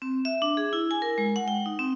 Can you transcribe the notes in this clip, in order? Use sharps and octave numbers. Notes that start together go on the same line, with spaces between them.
C4
E5
D4
G#4
E4
G#5
A#4
G#3
F#5
G5
D#4
C4